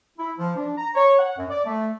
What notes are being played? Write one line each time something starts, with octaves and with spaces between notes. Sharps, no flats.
E4
F3
D4
A#5
C#5
F#5
F#2
D5
A3